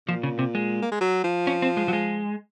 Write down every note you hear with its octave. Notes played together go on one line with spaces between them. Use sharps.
A#2 F3
C#3
C3
G#3
A#3
G#3
F#3
F3
C#4
C4
G#3
F#3
G#3